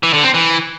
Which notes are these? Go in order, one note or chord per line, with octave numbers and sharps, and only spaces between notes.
E3
D3
C4
E3